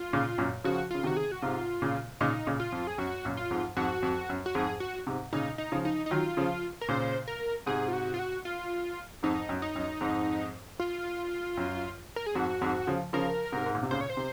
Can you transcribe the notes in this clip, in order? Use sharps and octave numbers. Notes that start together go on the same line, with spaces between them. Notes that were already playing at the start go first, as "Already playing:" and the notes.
Already playing: F4
A#2 C#3
F#2 A#2
C#3 F3 F#4
C#3 F4
C3 D#3 F#4
G#4
F#4
G#2 C3 F4
A#2 C#3
A#2 C#3 D#4
A#2 C#3
F4
F2
G#4
F#2 F#4
F#2 A#2
F4
F2 G#2
F2 G#2 F#4
F2
F#2
F#4
F2 G#2 G#4
F#4
G#2 C3
A#2 C#3 D#4
D#4
C#3 F3
D#4
D#4
D#3 F#3 F4
C#3 F3
A#4
A#2 C#3 C5
A#4
G#2 C3 G#4
F4
F#4
F4
F#4
F4
F2 G#2 D#4
F#2
D#4
F#2
F2 G#2
F4
F#2
A#4
G#4
F2 G#2 F#4
F2 G#2
C#3 F3
C#3 F3 A#4
G#2 C3
G#2
A#2
C3
A#2 C#3 C5
C#5
C5
C3